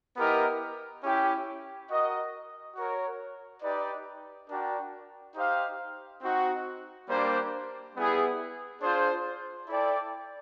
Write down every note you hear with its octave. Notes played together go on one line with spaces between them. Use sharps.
B3 E4 G4 A#4 D#5
C#4 E4 G4
F#4 A#4 D#5
F#4 A#4 C#5
D#4 G4 B4 D5
D4 F#4 A#4 D5 G5
D#4 G4 C5 F5
C4 D#4 F#4
G3 A#3 D4 G4 C5
G3 B3 E4 G#4
D4 F4 G#4 C5
E4 A4 D5 G5